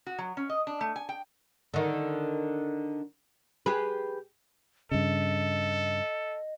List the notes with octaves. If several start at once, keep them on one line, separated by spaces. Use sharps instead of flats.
F#4
F#3
C#4
D#5
D4
A3
G#5
G5
D3 D#3
G4 G#4 B4
G2 C#3 A4 D#5